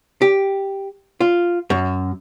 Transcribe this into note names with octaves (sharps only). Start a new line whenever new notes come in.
G4
F4
F#2